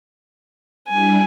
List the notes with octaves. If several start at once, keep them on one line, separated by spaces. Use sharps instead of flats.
G3 D4 E4 G#5